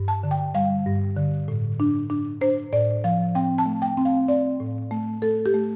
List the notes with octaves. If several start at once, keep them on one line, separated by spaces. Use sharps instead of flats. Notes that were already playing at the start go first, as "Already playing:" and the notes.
Already playing: G2
A5
D3
G5
G3 F5
G2
D3
A2
D4
D4
D4 C5
A2 D5
F3 F5
C4 G5
A5
A3
G5
C4
F5
C4 D5
A2
A3
A3 A4
G4
A3